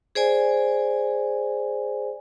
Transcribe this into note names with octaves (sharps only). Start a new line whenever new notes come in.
G#4 C5 D5 G#5